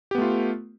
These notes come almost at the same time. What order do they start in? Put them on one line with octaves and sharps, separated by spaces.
G4 B3 A3 F4